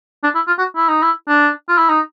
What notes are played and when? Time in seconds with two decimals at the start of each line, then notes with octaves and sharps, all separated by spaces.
0.24 D4
0.35 E4
0.47 F4
0.58 F#4
0.76 E4
0.89 D#4
1.02 E4
1.28 D4
1.69 F4
1.78 E4
1.89 D#4